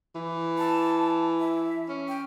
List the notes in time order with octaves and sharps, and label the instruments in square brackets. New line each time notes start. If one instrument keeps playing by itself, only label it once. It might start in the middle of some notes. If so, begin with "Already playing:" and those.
[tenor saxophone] E3
[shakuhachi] A5
E5
[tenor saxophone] C#4
[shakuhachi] G5